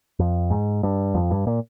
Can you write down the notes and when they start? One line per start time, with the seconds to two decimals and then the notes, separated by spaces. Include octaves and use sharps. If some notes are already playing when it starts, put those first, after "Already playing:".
0.19 F2
0.50 G#2
0.83 G2
1.14 F2
1.31 G2
1.47 A#2